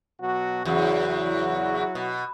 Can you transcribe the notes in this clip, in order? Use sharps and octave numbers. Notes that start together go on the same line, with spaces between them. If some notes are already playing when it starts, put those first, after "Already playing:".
B2 F#3 F#4
E2 C#3 F#3 E4 F#4
B2